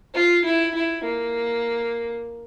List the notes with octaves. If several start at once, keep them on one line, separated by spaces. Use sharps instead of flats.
F4
E4
E4
A#3